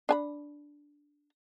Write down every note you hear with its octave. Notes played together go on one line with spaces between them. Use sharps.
D4 G#5 B5